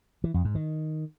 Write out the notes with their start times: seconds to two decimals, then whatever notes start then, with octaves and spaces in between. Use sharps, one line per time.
0.24 E3
0.34 F2
0.45 G#2
0.55 D#3